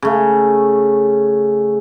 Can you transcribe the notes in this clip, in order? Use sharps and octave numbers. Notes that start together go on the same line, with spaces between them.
C#3 A3